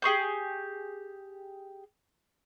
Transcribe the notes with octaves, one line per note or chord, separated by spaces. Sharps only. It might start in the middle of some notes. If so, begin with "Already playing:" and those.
G4 G#4 C#6 G6